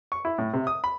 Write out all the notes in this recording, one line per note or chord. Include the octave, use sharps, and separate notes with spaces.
C#6
E4
A2
C3
D#6
B5